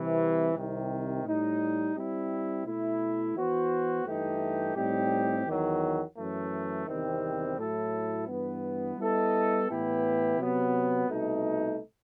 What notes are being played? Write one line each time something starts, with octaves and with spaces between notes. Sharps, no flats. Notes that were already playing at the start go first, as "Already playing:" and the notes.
Already playing: C2 C3 E3
C2 C3 D#3
A2 G3 D#4
G3 C4 E4
B2 A3 E4
E3 B3 F#4 C5
G2 E3 A3 D#4 G4
A2 G3 C4 D#4 G4
E2 D#3 F#3
F#2 E3 A3
E2 C3 D#3 G3 C4
A2 F#3 A3 E4 A4
G2 E3 B3
G3 B3 E4 A4 D#5
A2 E3 B3 E4 G4
C3 F#3 B3
C2 B2 A3 D#4